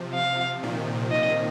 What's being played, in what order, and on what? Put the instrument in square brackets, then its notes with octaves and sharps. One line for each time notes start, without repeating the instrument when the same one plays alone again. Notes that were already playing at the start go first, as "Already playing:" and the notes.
Already playing: [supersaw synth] C3 F3
[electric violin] F5
[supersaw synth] A#2 D#3
[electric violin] D#5